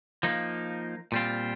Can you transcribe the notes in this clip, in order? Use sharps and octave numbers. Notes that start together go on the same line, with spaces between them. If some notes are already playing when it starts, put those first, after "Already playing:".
F3 A#3 D#4
A#2 G3 C4 F4